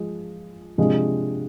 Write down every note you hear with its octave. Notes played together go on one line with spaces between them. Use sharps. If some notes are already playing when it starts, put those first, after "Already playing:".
Already playing: F3 G#3
C3 F3 G#3 D4